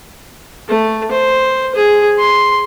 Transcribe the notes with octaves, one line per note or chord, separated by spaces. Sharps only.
A3
C5
G#4
C6